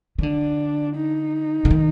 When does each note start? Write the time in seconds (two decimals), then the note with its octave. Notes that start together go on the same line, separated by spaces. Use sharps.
0.19 D#3
0.23 D3 D4
0.97 D#4
1.65 D3
1.71 D#3